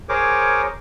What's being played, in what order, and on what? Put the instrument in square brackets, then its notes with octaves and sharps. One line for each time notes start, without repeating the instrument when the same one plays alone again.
[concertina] G#4 A#4 C5 C#5 D6